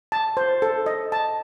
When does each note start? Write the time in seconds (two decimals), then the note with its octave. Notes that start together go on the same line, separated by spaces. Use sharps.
0.12 A5
0.37 C5
0.62 A4
0.86 D#5
1.12 A5